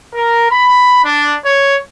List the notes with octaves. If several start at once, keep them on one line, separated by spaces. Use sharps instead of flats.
A#4
B5
D4
C#5